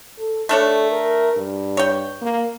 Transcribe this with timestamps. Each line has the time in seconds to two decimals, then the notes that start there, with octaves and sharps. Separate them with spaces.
0.18 A4
0.49 A3 D4 A4 C#5
0.92 A#4
1.36 G2
1.77 C#5 G5
2.22 A#3